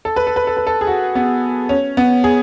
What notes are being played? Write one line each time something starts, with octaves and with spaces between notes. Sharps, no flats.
A4
B4
A4
B4
A4
B4
A4
G#4
F#4
B3
C#4
B3
G#4